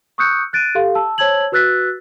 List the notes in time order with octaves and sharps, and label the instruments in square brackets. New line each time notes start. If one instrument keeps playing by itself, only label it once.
[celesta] C#6 D#6 E6 F#6 G6 C#7
F#6 A6 D7 D#7
G4 A4 F5 C6
A5 E6
C5 C#5 A5 E6 G#6 F#7
F#4 B4 E6 F#6 A6 B6